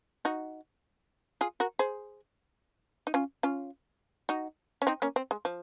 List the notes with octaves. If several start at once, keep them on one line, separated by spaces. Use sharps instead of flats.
D#4 F#4
F4 G#4
F#4 A#4
G#4 C5
D#4
C#4 F4
C#4 F4
D#4 F#4
C#4
C4 D#4
A#3 C#4
C4
G#3
F3